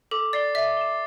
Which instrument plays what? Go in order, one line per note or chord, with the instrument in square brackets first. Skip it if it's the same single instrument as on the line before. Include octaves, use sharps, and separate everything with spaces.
[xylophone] A4 [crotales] D6
[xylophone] D5 [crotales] A6 C7 G7
[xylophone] E5 [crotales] A6
[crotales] E7 G7